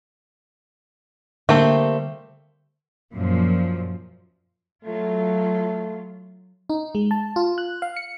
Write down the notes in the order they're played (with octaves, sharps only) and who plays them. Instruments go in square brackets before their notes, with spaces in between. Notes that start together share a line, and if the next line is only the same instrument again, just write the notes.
[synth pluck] D3 [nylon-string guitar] G3 A#3 [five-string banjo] A3 C4
[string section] F#2 A#2 F3
[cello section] F#3 F4 [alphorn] A3
[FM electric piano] D#4
G#3
A5
F4
F#6
F5
C#7